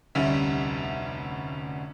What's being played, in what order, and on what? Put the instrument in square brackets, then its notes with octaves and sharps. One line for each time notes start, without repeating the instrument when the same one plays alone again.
[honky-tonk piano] F1 D2 G3 C#4 E5